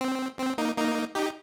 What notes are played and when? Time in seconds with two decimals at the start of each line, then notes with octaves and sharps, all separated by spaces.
0.01 C4
0.39 C4
0.58 A#3 D#4
0.77 A#3 D#4
1.15 D#4 G4